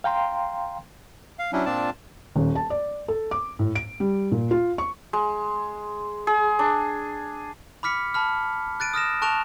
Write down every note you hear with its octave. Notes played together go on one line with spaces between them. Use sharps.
F5 G5 A#5 C6
F5
F#3 C#4 D4 E4
A#2 C4 D4 F4 D5 A5
D#1
A5
D5
A4
D6
A2
D7
G3
A#2
F4
C#6
G#3
G#4
D4
B5 D6 F6 B6 C#7
A5 B5 F6
F#6 A6 D7 D#7
D#6 F6 A#6 E7
A5 C#6 F#6 D7 E7 F7